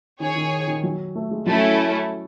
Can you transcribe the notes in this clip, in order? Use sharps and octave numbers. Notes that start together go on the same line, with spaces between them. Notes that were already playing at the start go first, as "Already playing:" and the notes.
D#3 G#4 C#5 G#5
D#3
D#3
F#3
A3
G#3
F#3 A3 C#4 E4 A4